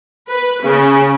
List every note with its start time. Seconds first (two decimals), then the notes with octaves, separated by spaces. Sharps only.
0.29 B4
0.63 C#3